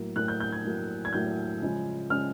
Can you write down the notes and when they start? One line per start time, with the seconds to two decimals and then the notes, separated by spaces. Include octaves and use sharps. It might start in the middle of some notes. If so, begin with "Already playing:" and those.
Already playing: A2 F#3 A#3
0.16 A2 F#3 A#3 F#6
0.28 G6
0.40 G6
0.52 G#6
0.65 A2 F#3 A#3
1.05 G#6
1.13 A2 F#3 A#3 G6
1.62 C#3 F3 G#3 C#4
2.10 C#3 F3 G#3 C#4 F6